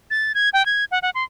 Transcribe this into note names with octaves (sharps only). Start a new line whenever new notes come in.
A6
G#6
G5
G#6
F#5
F#5
C6